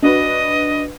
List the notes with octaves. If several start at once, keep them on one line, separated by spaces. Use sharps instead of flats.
D4 F#4 B4 D#5